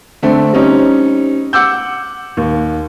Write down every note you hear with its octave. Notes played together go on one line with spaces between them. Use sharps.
D3 A3 C4
G3 C4 C#4 D#4
F#5 D6 E6 G6
D#2